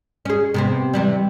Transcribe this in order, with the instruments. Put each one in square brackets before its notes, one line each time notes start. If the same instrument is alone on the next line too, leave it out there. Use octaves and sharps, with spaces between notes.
[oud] C#4 G#4
C3 B3 C4
C3 E3 G3